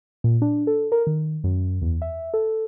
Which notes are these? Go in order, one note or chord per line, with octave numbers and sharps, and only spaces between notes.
A#2
D4
A4
A#4
D#3
F#2
E2
E5
A4